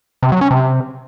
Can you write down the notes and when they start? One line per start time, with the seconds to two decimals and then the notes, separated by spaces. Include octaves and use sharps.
0.23 C3
0.32 F#3
0.41 C#4
0.51 C3